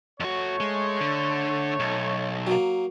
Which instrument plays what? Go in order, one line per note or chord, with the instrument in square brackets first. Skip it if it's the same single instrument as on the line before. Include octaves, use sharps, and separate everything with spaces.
[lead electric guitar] F2 F#4 [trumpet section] A3 C#5
[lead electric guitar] G#3
D3
B1
[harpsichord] F#3 A#3